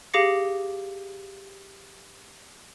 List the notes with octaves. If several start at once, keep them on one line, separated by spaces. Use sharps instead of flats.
G4 G#4 F5 D6 A#6 C#7